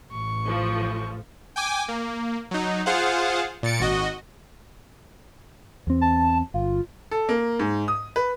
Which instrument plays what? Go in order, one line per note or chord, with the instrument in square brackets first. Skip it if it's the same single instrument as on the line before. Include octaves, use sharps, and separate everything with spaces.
[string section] A1 [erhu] C#6
[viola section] F3 A4
[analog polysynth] G5 G#5 D6
A#3
F#3 D#4
F4 G#4 C5 F5 F#5
A#2 A6 C#7 D7
G#1 F#4 D#5
[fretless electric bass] E2 C4
[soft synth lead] A5
[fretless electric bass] G1 [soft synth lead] F4
[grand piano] A4
A#3
G#2
D#6
B4